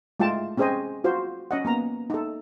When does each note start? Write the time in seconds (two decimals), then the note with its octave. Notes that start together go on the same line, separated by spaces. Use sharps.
0.20 G#3 A3 F4 G5 A5
0.57 C4 C#4 G#4 C5 D#5 G#5
1.04 F4 F#4 C5
1.51 C#4 D#5 F#5
1.65 A#3 B3 A#5
2.10 D#4 A4